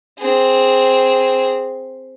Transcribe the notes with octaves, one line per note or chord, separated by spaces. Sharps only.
C4 G#4